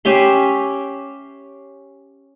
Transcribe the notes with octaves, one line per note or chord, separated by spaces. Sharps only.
C#4 G4 E5 C6